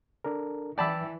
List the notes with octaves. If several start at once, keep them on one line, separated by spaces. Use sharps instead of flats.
D4 A4 A#4
E3 D5 G5 A5 B5 E6